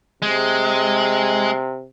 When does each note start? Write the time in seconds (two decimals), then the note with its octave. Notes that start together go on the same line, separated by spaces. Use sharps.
0.22 C3 G#3